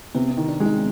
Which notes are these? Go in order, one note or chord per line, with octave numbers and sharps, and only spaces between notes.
C3 B3
C4
D#3
D4
G#3
D#4